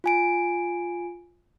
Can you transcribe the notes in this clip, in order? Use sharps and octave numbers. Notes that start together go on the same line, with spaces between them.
F4 G#5 D7